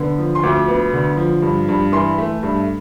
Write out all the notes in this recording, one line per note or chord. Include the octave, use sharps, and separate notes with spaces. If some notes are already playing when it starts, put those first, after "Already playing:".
Already playing: D3 B3
F3
C6
D2 D6
B3
D3
F3
G2
G2
E3 C6
A3
G2